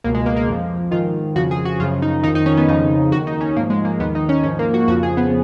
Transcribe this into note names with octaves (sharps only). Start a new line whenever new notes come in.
C#2 B2 A#3
G#3
A#3
A#3
F2 F3
G#2 D#3 F4
F2 C#3 F3 F#4
G#4
F#4
F#2 C#3 F3 F4
D#4
F2 D#3 D#4
D#4
C#4
B3
F2 C#3 F3 D#4
D#2 D#3 F#4
D#4
C#4
G#2 F3 A#3
G#3
A#3
D#2 D#3 B3
D#4
C#4
G#2 F3 C#4
A#3
F#4
F2 C#3 F3 F#4
G#4
B3